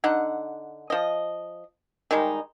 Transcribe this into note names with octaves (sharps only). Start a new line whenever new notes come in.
D3 D#4 F#5
F3 D#5
D#3 G3 G#3 D#4